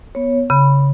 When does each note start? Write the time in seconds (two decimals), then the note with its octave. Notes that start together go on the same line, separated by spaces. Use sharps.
0.15 B3 C#5
0.50 C#3 B5